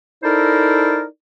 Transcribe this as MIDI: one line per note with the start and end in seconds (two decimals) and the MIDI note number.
0.24 1.03 63
0.24 1.03 64
0.24 1.03 69
0.24 1.03 70
0.24 1.03 72
0.24 1.03 74